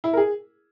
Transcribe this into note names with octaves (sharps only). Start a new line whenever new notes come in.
E4
A#4
G#4